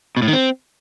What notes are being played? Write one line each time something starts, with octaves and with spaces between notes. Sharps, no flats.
B2
A2
D#3
C4